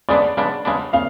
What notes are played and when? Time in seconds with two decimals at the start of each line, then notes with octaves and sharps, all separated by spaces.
0.09 C#3 G#3 B3 D4 D5
0.37 C#3 G#3 B3 D4
0.65 C#3 G#3 B3 D4
0.93 C#3 F5